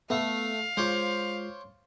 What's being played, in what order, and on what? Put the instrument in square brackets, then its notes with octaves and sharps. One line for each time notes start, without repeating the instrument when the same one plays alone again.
[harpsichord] A3 [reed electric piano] B3 [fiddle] F5
[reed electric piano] G#3 F4 [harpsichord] C5 C#5 D6